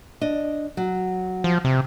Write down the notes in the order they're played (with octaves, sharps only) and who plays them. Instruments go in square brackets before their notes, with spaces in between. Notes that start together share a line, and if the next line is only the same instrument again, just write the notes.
[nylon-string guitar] D4 D#5
F#3
[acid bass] F3
C3